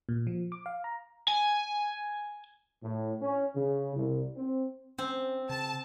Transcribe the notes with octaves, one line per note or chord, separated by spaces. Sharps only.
A#2
F3
D6
F5
A#5
G#5
A2
C#4
C#3
C2
C4
C4 C#4
C#3 A5